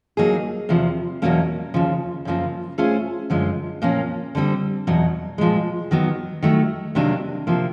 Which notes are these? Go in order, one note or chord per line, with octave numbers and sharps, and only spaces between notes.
F#3 A#3 D#4 G#4
E2 C3 F3
E2 B2 F#3 A#3 C#4
D#2 C#3 F3
F#2 C#3 F3 A#3
A3 C#4 F4 G#4 C5
F#2 D3 F3 G#3
A#2 F3 A#3 C#4
D3 G3 C4
E2 B2 F#3
A#2 F3 G#3
D#3 F#3 B3
D#3 F#3 A3
C3 D#3 F#3 A#3 D4
C3 F3 A#3